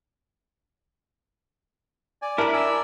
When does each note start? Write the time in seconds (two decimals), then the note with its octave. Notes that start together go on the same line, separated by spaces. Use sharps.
2.22 D5 G#5
2.38 D4 E4 A#4 A#5
2.53 D5 G#5 E6